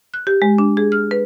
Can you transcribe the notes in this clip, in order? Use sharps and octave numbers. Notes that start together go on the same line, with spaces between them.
F#6
G4
G#3
D4
G#4
F6
B4